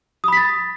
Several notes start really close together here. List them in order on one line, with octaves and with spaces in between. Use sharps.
D#6 B5 B6 A6